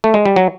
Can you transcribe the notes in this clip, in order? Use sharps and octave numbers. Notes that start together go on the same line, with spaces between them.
A3
G#3
G3
F#3